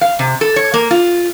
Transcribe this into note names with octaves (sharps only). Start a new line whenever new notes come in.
F5
C3
A4
C#5
A#3
F4